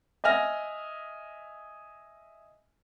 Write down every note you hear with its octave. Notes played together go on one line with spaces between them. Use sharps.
D#5 E5 G#5 F6 A#6